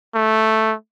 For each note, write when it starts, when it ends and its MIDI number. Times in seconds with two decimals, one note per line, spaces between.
0.14 0.74 57